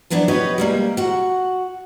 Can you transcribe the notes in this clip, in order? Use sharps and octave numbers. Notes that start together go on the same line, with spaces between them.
F3 F#3 B3 D4 E4
F#4 G4 B4 C#5 D#5
G3 G#3 A#3
F#4 F#5